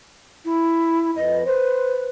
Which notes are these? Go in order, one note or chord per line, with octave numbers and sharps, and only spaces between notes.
E4
F2 B4 D#5
B4 C5